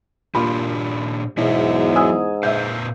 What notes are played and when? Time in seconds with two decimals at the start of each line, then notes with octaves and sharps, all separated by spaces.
0.35 A#2 A#3 D4 F4 G4 B5
1.37 E2 G#2 B2 F#3 C#5 E5
1.95 G#5 D#6 E6
2.43 A#2 B4 E5 F5 G6